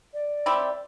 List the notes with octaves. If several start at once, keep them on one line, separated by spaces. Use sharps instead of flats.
D5
C4 E4 G4